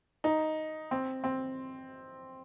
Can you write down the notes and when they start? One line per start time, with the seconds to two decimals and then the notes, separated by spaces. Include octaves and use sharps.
0.24 D#4
0.91 C4
1.24 C4